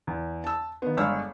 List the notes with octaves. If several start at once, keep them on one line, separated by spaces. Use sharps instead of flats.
E2
A5 E6
D#3 B3
G1 G#3 C#5 D5 E6 F6